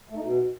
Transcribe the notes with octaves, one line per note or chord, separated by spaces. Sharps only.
A3
D#4
B2